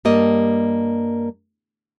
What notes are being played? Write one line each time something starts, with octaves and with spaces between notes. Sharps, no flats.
G2 G3 A#3 D#5